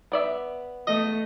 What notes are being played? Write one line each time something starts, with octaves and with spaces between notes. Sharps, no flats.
B3 D5 E5
A3 D#5